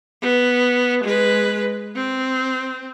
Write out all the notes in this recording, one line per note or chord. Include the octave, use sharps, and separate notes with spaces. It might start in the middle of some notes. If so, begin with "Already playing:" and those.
B3
G#3 B4
C4